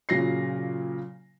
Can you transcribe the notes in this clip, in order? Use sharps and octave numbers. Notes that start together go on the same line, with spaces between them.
A#2 C#3 F#3 A#6 C7